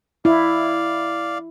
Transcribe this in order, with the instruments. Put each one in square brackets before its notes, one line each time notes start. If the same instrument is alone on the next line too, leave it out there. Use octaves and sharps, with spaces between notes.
[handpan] E4 [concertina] D5 F5